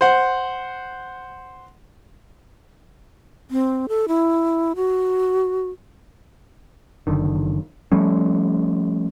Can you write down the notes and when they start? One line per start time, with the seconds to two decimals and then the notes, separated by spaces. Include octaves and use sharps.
0.01 C5 F#5
3.51 C4
3.89 A4
4.08 E4
4.76 F#4
7.07 F#1 D3 D#3
7.92 F3 G3 A3 C#4